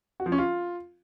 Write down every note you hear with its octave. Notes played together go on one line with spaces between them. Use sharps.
F#4
F3
C#4
F4